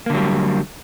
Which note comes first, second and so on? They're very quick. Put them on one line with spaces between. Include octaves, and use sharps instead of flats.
A#3 D3 F#3 G3